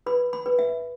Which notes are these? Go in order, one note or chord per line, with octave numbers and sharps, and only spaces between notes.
B4 B5
B5
B4
E5